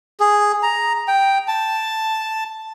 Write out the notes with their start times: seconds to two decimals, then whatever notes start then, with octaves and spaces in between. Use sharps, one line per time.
0.20 G#4
0.63 A#5
1.08 G5
1.48 A5